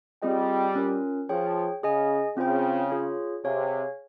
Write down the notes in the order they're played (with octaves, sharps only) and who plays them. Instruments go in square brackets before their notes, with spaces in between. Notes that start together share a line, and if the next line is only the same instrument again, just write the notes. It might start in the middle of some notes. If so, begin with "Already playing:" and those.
[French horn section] G3 [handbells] C4 F4 G#4 D#5 G5
[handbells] C#4 F4 A#4
[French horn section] F3 [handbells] G#4 C#5 G5
[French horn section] C#3 [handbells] G#4 D#5 G#5
[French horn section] C#3 [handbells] C4 F4 C5 G5
[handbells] F4 G#4 C#5
[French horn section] C3 [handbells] G#4 C#5 F5 G#5